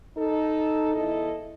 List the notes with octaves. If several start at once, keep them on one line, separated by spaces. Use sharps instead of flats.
D#4 A4
E2 E4 A4 D#5